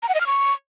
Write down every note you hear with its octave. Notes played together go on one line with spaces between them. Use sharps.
A#5
F#5
D#5
F6
C#6